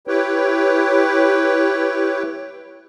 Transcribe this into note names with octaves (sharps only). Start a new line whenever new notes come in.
E4 G4 B4 C#5 G5